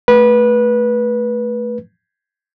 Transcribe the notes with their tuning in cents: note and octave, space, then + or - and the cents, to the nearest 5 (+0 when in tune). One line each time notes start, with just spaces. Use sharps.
A3 -5 B4 -20